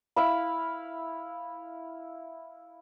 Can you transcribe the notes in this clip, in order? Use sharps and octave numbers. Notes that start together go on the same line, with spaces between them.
E4 F5 B5